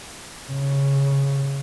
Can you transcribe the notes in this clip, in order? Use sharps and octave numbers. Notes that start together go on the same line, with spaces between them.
C#3